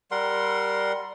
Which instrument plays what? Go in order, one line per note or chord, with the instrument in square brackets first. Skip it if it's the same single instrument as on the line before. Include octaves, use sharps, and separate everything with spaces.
[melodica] G3 A#4 F#5 C6